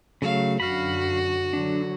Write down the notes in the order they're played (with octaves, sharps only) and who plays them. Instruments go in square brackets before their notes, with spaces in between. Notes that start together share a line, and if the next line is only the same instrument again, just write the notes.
[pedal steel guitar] C#3 F#3 A3 [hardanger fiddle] F5
[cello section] F#2 D3 [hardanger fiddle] F#4 [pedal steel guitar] F5 B5
[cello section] D3 F#3 [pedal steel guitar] D4